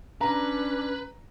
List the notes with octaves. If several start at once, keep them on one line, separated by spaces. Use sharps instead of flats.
C#4 D4 B4 A#5